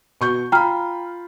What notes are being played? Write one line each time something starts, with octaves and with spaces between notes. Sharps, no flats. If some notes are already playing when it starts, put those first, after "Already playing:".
B2 C#6 G6
F4 G5 A#5 B5 F6